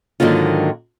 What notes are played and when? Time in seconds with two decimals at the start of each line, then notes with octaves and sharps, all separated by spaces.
0.20 G#2 D3 D#3 F#3 A#3 F4